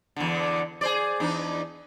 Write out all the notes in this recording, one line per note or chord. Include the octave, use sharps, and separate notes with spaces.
E2 D3
G#4 C5 D5
E2 D4 D#4